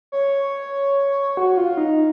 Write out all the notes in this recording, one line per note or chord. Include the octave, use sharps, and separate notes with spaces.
C#5
F#4
F4
D#4